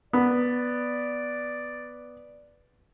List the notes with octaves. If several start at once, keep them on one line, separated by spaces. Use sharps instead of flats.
B3 D5